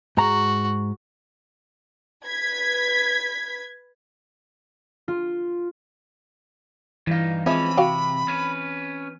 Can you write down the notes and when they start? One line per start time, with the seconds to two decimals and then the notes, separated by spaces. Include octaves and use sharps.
0.17 G#2 F#4 A#5
2.25 B4 G#6 B6
5.08 F4
7.07 G2 E3 D#4 F5
7.46 E3 F3 G#3 C4 C#4 E5 B5
7.77 C3 F#4 F5 G5
8.28 C#4 B4